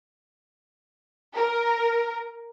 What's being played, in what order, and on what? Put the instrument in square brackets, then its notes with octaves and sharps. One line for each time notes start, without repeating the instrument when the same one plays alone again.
[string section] A#4